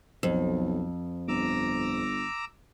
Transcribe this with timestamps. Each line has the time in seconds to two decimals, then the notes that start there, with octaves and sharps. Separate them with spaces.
0.23 B1 F2
1.28 G1 A#5 D6 E6